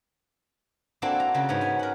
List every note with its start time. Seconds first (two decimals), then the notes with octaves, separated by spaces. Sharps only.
1.02 A#3 C4 D4 E4 F#4 A4
1.20 A#5
1.34 C#3 A#3 F#4
1.49 G#2 G#3 B3 C#4 C#5
1.61 G#5
1.79 A#4 F#5